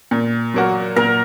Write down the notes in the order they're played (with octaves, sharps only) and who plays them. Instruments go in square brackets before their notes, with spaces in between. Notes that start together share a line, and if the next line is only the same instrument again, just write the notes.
[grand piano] A#2
F#3 A#3 F#4
[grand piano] A#2 [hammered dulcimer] A#4